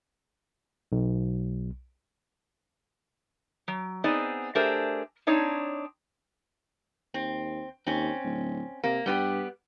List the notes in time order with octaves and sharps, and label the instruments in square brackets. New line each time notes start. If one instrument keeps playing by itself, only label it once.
[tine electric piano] B1
[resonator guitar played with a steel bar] F#3
B3 C4 D#4 G#4 D5
A3 D4 G4 G#4 A#4 C5
C4 D4 D#4 C#5
[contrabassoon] D#2 [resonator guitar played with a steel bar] C4
[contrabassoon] D#2 [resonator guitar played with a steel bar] C4 C#4
[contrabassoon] D1
[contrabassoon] C3 [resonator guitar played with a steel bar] A#3
[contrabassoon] G2 [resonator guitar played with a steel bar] G3 B3 G4